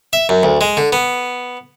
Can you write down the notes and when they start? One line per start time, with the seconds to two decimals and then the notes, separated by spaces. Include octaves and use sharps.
0.13 E5
0.29 F#2
0.43 D2
0.61 G#3
0.77 D3
0.93 B3